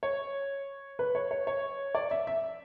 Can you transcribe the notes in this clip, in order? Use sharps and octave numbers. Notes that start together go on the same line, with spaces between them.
C#5
B4
C#5
C#5
C#5
D5
E5
E5